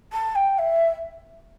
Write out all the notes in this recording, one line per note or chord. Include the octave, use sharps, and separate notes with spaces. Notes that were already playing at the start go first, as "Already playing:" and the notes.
A5
G5
E5